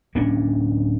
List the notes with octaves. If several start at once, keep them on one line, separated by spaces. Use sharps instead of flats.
D1 A#3 C#4 D4